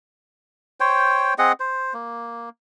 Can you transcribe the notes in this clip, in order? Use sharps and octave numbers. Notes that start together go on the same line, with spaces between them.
C5 C#5 G5
C4 G#4 D#5 F#5
C5
A#3